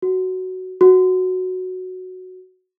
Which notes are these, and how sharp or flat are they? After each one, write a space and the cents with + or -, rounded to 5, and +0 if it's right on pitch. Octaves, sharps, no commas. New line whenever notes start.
F#4 +10
F#4 +0